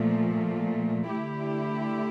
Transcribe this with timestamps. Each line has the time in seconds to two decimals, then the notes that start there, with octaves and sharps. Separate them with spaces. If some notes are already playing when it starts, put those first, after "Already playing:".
Already playing: A#2 F3 A3
1.09 D3 A3 E4 G4